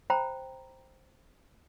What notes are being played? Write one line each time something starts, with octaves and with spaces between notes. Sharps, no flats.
C5 G5 A#5 B5